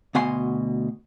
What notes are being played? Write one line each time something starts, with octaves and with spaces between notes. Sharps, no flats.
D2 B2 F#5 G#5 C6